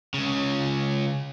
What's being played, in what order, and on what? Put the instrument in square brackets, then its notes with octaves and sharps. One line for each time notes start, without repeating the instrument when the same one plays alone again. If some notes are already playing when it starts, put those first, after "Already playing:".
[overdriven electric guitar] C#2 C#3